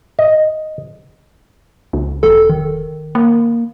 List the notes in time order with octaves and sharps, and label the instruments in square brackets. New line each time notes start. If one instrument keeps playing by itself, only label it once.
[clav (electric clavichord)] D#5
[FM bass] C#2
[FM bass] E1 [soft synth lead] A4
[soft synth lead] D#3
[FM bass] A#3